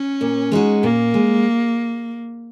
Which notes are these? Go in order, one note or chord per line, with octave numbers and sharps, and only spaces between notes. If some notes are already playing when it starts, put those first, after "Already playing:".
Already playing: C#4
A#2
G#3 D#4 F#4
A#2 A#3
G#3